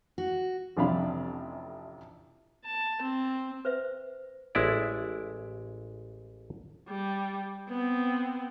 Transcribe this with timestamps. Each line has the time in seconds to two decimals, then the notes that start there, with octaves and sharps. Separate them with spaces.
0.18 F#4
0.77 A1 F2 C3 D4 F5 B5
2.65 A5
3.02 C4
3.65 B4 C5 E5
4.55 A1 G#3 E4 D5
6.88 G3
7.68 B3 C4